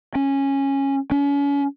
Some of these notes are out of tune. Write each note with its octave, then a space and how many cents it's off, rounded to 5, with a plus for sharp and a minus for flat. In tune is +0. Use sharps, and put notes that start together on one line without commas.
C#4 -10
C#4 +35